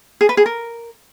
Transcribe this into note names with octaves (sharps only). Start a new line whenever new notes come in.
G#4
B4
G#4
A#4